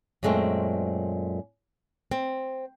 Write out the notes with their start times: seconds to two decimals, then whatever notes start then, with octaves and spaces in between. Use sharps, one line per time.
0.23 F#2 A#2 G#3 A3 C4
2.11 C4